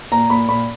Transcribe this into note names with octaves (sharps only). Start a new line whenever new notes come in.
A#2 A#5
A#2 B5
A#2 B5